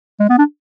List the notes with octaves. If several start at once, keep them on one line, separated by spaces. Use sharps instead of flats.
G#3
B3
D4